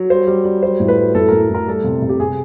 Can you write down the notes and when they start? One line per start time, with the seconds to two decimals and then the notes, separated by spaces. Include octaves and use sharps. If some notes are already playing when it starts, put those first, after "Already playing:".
Already playing: F#3
0.10 G3 C5
0.27 G3
0.45 G3
0.63 F#3 C5
0.80 A2
0.88 B4
0.97 F#3
1.15 A2 A4
1.29 A2 A#4
1.42 A4
1.50 A2 A#4
1.68 G3 A4
1.84 C3
2.02 C3
2.09 G4
2.20 C3 G#4